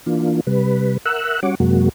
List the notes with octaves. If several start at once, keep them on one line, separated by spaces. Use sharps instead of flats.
E3 A#3 D4 F4
C3 G3 B4
A#4 E5 F#5 E6 F#6
G3 C#4 F#4 C#5 F#5 D6
F#2 C3 F#3 G#3 A#3 F#4